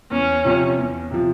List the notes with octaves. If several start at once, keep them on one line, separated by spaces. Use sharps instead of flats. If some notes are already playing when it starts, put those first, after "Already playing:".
E2 C#4
C3 F3
E2
C3 F3